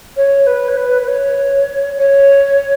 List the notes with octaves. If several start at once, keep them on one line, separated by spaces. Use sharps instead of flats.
C#5
B4
C#5
B4
B4
C#5
C#5